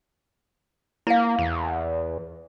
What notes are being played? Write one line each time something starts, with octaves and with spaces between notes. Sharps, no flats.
A#3 E4 F5
E2